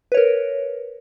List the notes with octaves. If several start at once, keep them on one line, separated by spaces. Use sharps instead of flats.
A#4 B4 C#5